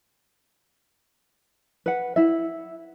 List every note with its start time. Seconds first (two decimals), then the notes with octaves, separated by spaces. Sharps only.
1.86 B4 F#5
2.16 E4 E5